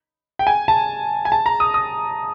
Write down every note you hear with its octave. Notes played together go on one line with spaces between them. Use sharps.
G5
G#5
A5
G#5
A5
A#5
D#6
D#6